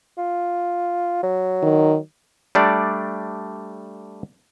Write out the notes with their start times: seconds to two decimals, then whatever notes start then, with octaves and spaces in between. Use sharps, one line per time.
0.18 F4
1.23 F#3
1.63 D#3
2.55 G3 A3 D4 D5